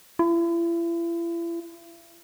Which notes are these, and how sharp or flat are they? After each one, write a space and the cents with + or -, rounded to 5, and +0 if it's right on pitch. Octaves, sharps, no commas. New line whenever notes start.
E4 +40